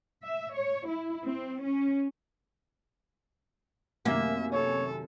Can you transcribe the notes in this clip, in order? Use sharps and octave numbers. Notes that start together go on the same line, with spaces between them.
E5
C#5
E4
C4
C#4
F#2 C3 D#3 A#3 E5
A4 C#5